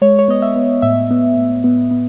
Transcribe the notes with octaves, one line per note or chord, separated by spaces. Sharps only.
G#3 C#5
C#5
B3 D#5
E5
B3
A2 E5
B3
A2
B3
B3